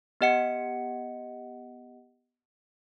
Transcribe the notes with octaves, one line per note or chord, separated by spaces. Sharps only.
B3 G4 D#5 F#5 C#7